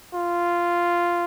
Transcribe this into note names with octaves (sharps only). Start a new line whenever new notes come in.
F4